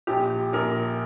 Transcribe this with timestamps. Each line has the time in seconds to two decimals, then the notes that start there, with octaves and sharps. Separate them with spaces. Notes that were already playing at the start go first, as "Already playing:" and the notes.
0.07 A#1 G4
0.53 A#1 A#4